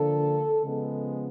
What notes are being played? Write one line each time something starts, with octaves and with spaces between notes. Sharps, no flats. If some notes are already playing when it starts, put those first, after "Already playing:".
Already playing: D3 F3 A#3 D4 A4
C#3 F3 G#3 B3